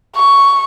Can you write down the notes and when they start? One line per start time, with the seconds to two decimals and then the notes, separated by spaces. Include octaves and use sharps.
0.16 C#6